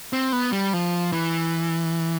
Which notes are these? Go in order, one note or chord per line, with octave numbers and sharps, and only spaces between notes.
C4
B3
G3
F3
E3